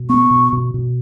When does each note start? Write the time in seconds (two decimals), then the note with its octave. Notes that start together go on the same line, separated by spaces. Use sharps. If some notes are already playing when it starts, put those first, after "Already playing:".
Already playing: B2
0.09 B3 C#6
0.31 B2
0.53 B2
0.74 B2